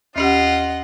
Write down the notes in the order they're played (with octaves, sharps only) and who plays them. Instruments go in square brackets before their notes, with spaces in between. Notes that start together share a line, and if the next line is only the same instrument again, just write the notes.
[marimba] D#2 C#4 G4 [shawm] F4 [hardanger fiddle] D#5 F#5